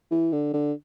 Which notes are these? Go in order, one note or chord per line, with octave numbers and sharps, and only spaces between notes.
E3
D3
D3